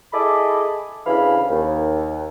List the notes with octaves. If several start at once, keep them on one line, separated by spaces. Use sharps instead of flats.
E4 G#4 A4 D#5 B5 D6
D2 C#3 E3 F5 B5
D#2